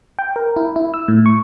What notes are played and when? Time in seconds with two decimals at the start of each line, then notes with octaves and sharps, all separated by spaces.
0.19 G5
0.36 A#4
0.56 E4
0.76 E4
0.94 E6
1.08 A2
1.26 C#6